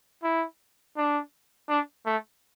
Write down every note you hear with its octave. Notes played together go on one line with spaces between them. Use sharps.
E4
D4
D4
A3